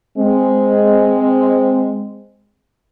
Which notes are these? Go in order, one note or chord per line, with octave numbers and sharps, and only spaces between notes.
G#3 C4